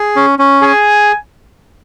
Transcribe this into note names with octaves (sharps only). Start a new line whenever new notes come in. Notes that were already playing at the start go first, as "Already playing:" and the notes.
Already playing: G#4
C#4
C#4
G#4 G#5